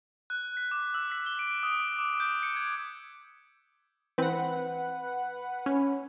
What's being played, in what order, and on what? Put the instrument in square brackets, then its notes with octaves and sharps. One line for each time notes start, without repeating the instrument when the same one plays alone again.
[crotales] F#6
B6
D6
E6
B6
G7
D7
D#6
D6
G6
C#7
G#6
[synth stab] E3 C4 [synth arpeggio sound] B4 F#5
[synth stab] C#4